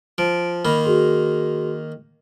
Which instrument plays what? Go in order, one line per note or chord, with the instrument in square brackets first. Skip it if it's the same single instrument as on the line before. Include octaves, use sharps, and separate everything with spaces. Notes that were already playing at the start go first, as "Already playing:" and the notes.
[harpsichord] F3 [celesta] D7
[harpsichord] D#3 A#3 [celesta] B5
[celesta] F#4 G#4 C6